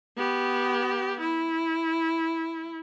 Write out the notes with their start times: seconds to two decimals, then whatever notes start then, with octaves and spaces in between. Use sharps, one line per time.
0.17 B3 G4
1.20 E4